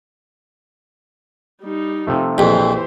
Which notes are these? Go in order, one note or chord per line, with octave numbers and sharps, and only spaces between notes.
G3 D#4
C3 F3 A3
A#1 F2 E3 G4 C5